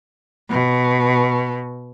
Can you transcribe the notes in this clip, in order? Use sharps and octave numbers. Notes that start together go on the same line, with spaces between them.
B2